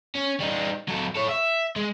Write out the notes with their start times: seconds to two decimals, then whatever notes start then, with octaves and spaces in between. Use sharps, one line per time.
0.15 C#4
0.40 G3 D#4
0.88 F#3 A4
1.15 A4 C#5
1.29 E5
1.76 G#3